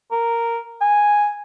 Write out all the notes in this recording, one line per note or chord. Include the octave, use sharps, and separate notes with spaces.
A#4
G#5